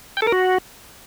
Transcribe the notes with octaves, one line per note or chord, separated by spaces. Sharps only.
G5
A4
A#4
F#4